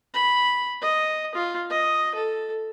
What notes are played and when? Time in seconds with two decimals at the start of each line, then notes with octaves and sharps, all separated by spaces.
0.14 B5
0.82 D#5
1.35 F4
1.70 D#5
2.15 A4